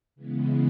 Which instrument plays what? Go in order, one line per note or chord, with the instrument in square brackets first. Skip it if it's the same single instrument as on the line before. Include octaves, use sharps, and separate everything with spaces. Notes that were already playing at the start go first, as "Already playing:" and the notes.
[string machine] C#3 E3 G#3 B3